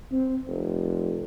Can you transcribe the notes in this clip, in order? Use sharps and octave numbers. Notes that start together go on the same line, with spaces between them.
C4
F1